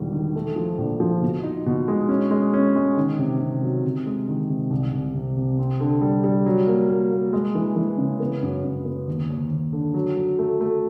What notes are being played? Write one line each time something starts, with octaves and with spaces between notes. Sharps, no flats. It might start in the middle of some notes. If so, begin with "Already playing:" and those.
Already playing: E1 D#3 G3
D#3
A3
F3
A#1
F3
B2
D#4
B2
G#3
C#4
G#3
C#4
G#3
D#3
C3
C3
F#3
C3
G#3
D#3
C3
C2
C2
C3
C3
C4
D3
G3
G3
F#3
A#3
A#3
A#3
G#3
E3
E3
C#3
B3
F#2
F#2
B3
D#2
D#2
D#2
D3
F#3
F#3
A3
A3